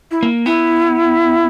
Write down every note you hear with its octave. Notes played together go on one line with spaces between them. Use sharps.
E4
A#3
B3 E4